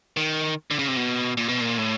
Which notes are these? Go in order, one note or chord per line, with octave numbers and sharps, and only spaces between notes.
D#3
D3
C#3
C3
B2
A#2
B2
A#2
A2